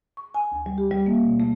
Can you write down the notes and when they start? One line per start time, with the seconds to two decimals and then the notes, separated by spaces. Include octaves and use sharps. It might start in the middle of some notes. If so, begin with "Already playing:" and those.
0.17 C#6
0.34 G#5
0.52 D2
0.66 G3
0.78 G4
0.91 G3
1.06 A#3
1.23 B2
1.40 A3